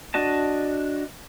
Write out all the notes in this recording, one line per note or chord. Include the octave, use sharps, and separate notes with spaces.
D4 F#4 D#5 A5